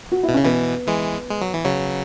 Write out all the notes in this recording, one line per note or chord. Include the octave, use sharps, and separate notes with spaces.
F#4
E4
B2
C#3 C#4
B2 E3 B3
E3 G#3
G#3
F#3
E3
C#3 F#3